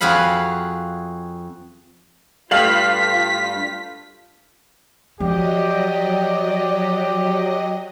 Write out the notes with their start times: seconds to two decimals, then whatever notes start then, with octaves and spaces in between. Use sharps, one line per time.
0.01 F2 F#4 G#4 F5 B5
2.51 G2 G3 A3 F4 F5 B6 F#7
5.20 F3 F#3 G4 D5 D#5